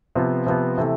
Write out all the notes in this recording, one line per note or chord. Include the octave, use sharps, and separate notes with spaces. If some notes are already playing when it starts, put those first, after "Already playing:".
C3 F3 B3
C3 F3 B3
C3 E3 A3